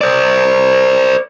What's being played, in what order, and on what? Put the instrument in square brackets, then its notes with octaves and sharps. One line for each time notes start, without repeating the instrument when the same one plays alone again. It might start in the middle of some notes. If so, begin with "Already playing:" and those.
[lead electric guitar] C5 D5